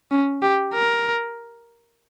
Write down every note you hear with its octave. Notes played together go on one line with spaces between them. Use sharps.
C#4
G4
A#4